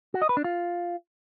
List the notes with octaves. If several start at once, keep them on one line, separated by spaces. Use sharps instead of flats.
F#4
D#5
B4
D4
F4